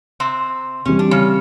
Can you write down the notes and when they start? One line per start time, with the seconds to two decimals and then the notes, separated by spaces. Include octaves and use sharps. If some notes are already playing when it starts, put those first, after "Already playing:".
0.20 C3 C4
0.85 C3 E3 G3 C#4
0.99 D4
1.11 C#3 C#4